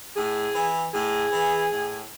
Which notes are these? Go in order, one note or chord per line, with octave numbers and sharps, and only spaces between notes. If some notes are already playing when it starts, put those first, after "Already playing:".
A2 G#4
E3
A2 G#4
E3
A2